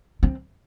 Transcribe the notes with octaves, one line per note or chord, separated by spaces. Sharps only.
C4